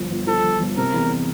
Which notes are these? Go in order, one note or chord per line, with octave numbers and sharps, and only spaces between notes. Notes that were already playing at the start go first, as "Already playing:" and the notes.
Already playing: G1 F3
G1
F3 A4
G1
G1
C3 A#4
E2